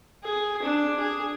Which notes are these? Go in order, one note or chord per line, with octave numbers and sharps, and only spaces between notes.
G#4
D4
G#4